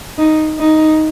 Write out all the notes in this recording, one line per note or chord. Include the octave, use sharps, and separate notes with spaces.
D#4
D#4